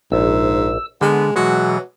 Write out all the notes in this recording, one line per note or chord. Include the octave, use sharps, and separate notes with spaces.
A#1 G#2 E6
D3 G#3 B3
B2 E3 F#3 G#3 F#4